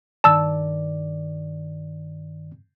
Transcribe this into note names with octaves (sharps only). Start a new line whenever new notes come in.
G2 D#3 D5 A5 E6